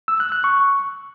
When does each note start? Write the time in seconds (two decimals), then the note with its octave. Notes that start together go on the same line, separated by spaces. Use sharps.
0.08 E6
0.20 F#6
0.32 F#6
0.44 C#6